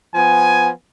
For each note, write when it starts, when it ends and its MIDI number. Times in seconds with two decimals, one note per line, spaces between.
0.15 0.69 53
0.15 0.69 59
0.15 0.69 80